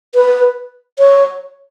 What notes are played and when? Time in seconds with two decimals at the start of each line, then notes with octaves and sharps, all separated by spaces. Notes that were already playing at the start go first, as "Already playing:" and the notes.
0.15 B4
0.99 C#5